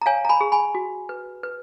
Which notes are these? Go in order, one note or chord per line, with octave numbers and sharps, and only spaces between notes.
A#5
C#5 F5 G#5
A#5
G#5 B5
G#4
G#5 B5
F#4
B4
B4